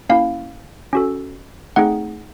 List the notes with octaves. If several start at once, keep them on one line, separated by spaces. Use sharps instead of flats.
A#3 C#4 E4 F5
C#4 F#4 A4
A3 C4 D#4 G#4 F#5